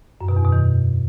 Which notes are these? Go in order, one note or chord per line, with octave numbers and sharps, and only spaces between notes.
F#2
B2
E2
B2
D#3